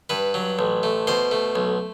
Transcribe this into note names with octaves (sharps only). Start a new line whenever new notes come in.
G2 B4
F#3
A1
A3
B2 C5
A3
B1